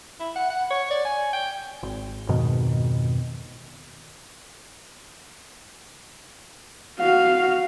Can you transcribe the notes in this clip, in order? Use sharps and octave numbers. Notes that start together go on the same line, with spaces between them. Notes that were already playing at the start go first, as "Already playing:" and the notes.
E4
F#5
F#5
C#5
D5
G#5
G5
G#1
F2 G#2 B2 D#3
F#4 F5